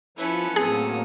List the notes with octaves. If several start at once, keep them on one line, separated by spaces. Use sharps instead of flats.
F3 C#4 E4 A4 B4
A2 F#3 A#3 C4 G#4 D#6